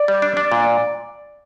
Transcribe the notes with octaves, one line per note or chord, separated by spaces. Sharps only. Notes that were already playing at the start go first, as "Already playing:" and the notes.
Already playing: D5
G3
D4
D4
A#2